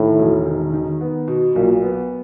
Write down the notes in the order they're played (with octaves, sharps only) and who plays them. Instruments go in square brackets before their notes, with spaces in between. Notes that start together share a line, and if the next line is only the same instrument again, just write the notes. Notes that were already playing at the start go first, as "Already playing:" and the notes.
Already playing: [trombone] A2 [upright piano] D#3
[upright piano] E1
D#3
D#3
B3
B2
[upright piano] B1 [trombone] A#2
[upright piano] B3